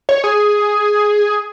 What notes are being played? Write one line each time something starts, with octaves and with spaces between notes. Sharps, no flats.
C#5
G#4